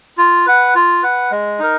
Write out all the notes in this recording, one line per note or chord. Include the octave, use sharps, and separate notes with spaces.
F4
B4 F#5
F4
B4 F#5
G#3
D#4 A#4